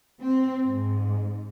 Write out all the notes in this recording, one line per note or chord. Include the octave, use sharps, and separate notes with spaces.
C4
G#2